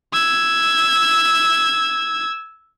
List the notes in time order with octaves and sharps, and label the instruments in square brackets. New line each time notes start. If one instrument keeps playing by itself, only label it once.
[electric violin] E6 G#6